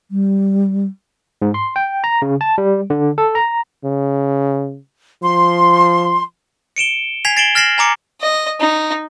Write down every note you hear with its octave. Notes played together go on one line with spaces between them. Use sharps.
G3
G#2
C6
G5
A#5
C#3
A5
G3
D3
A4
A#5
C#3
F3 C6
C#7 D7 E7 G7
G#5 G#6 B6 C7 F7
A6 C7 D7 E7 F#7 G7
F6 A6 A#6 C7 E7 F#7
G#5 A#5 D6 C#7
D#5
D#4